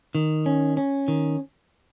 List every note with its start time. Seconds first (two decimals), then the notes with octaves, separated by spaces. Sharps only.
0.15 D#3
0.46 C#4
0.77 C#4
1.08 D#3